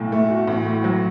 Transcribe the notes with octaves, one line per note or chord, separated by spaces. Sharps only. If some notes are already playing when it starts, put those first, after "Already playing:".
Already playing: B1 A2
A3
F#4
A1
A2
F#3